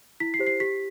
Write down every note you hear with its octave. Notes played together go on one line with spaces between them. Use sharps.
E4 B6
C7
G4 C5
C7
G4 B6